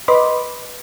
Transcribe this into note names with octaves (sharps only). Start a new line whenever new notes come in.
B4 D#5 B5 C6 D6